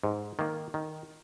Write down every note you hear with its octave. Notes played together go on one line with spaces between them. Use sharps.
G#2
D#3 A#3
D#3